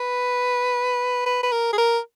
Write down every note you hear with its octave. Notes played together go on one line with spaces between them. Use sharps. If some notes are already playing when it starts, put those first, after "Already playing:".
Already playing: B4
B4
B4
A#4
G#4
A#4